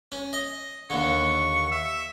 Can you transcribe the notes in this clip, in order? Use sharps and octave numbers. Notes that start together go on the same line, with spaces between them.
C#4
D#5
D#2 D3 C#6
E5